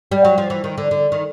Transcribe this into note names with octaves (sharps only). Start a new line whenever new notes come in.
G3
F#3
F3
E3
D#3
D3
D3
D#3